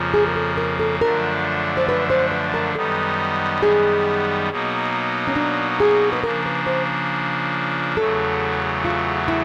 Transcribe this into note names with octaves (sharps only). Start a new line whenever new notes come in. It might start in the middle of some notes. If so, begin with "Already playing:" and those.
Already playing: F2 C#3 F3 A#3
G#4
A#4
A4
A#4
A4
F#2 D3 F3 A3 D4 A#4
C5
B4
C5
B4
A#4
F#2 D#3 G3 B3 D#4 A4
G#4
B2 F#3 A#3 D#4
C#4
D4
G#4
B4
C#3 F3 A#3 D4 A#4
B4
C5
E2 C#3 F#3 A3 A4
F4
E4